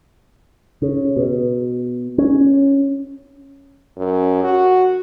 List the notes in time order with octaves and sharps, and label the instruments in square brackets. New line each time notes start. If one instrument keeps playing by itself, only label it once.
[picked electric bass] C#3
B2
C#4
[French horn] F#2
F#4